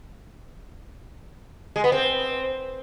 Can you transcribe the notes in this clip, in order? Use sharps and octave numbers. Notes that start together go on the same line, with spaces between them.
G#3
B3
C4